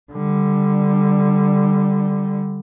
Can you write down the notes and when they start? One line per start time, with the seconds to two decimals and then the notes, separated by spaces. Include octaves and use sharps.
0.12 D3 G3